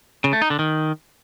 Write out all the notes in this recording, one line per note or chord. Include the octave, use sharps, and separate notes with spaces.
C#3
A3
D#4
D3
D#3